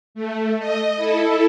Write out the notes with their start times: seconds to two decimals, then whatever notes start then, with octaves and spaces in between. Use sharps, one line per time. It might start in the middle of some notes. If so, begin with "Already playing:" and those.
0.15 A3
0.59 D#5
0.97 E4 A4